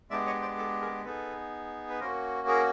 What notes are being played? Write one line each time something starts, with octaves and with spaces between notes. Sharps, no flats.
G#3 B3 D4 G4 D5 E5
C#5 D#5
C5 D5
A4
G#4 A#4
B3 D#4 G#4 A4 B4
B4
A#3 C#4 F#4 A#4 C5
G#4 A#4